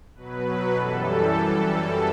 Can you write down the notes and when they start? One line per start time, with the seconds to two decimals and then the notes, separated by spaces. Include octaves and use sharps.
0.16 B2 F#3 B4
0.73 F#2 E3 G3 A4